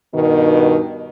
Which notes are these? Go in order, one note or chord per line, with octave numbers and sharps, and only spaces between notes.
G2 B2 D#3